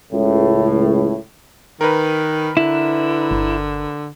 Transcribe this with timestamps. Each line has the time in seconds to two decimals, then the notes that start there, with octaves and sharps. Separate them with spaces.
0.12 C#2 A2
1.81 D#3 A#4 B4
2.57 D3 E4
3.31 G1